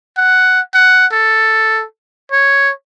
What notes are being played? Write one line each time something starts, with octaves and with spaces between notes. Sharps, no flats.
F#5
F#5
A4
C#5